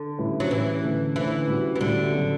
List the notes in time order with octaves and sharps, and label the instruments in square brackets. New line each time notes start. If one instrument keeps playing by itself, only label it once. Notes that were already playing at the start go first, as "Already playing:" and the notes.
Already playing: [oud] D3
[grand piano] A2 G3 C#4 E4 B4
[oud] F#3
[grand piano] A2 G3 C#4 E4 B4 [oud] E3
[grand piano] D3 A3 C#4
[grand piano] D3 A3 C#4 [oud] E3
[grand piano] A2 G3 C#4 F#4
[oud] E3
[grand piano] A2 G3 C#4 F#4 [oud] D3
[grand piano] C#3 F#3 B3